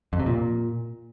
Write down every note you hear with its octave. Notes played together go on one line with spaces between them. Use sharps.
F2
C3
A#2